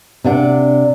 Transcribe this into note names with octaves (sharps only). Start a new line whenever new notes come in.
C3 D4 D5 F#5